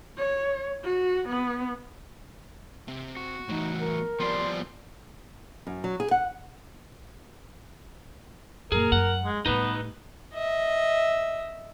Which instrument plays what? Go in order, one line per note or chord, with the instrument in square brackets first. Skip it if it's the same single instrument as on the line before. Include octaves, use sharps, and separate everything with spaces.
[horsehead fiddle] C#5
F#4
B3
[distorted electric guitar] C3
[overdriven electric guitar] F#4
[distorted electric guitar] E2 A2 [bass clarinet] D#4
[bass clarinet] A#4
[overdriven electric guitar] F3 G3 [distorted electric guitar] B3 D5 [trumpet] C6
[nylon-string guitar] F#2
F#3
G#4
F#5
[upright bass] F#2 A#2 [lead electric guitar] G#4 [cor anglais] A#4
[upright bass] F#2 [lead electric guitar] F#5
[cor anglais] G#3
[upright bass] A2 G3 [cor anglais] B3 [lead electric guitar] D#4 B4
[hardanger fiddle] D#5 E5